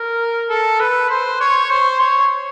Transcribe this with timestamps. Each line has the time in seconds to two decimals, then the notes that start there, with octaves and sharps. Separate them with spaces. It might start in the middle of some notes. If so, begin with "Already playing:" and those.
Already playing: A#4
0.50 A4
0.80 B4
1.10 C5
1.40 C#5
1.70 C5
2.00 C#5